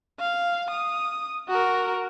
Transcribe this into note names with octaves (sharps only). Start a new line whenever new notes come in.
F5
D#6
F#4 A#4